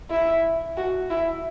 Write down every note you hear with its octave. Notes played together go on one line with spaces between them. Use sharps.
E4
F#4
E4